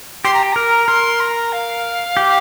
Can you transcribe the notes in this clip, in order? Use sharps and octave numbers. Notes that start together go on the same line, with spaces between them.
G4 C6
A#5
G5
A#4 A#5
A#4 C6
A#5
F5
G4